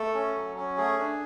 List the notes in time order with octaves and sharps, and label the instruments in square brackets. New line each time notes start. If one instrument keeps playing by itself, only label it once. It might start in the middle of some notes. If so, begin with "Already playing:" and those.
Already playing: [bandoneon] A3 A4
C#4
F#3
C#4
A3 G#4
D4